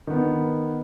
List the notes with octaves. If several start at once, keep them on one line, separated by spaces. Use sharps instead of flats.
D#3 B3